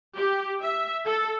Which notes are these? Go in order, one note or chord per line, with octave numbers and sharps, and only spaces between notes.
G4
E5
A4